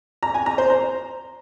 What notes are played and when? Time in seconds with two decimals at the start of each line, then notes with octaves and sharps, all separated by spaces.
0.23 A#5
0.34 G#5
0.46 A#5
0.58 C5
0.70 A#5